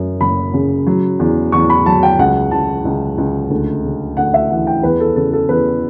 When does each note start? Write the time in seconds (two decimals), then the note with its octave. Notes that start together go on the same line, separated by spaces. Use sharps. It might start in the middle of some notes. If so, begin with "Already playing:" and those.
Already playing: F#2 F#3
0.21 F#1 B5
0.54 C#3
0.87 F#3
1.19 E2
1.52 E2 C#6
1.70 B5
1.86 F#3 A5
2.03 G5
2.19 C#2 F#5
2.51 C#2 A5
2.85 C#2
3.18 C#2
3.50 D2
3.84 C#3
4.17 D2 F#5
4.34 E5
4.51 E3 F#5
4.67 G5
4.83 E2 B4
5.00 A4
5.16 C#3 A4
5.33 A4
5.49 E2 B4